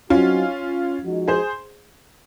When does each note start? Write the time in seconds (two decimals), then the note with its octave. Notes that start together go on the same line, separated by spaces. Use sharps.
0.10 F#3 C4 C#4 D#4 F4 F#4
1.04 F3 G#3 D#4 F#4
1.28 G#4 C5